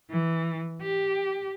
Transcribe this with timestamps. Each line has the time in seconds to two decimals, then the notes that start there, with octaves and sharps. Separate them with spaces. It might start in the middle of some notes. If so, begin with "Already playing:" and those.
0.10 E3
0.82 G4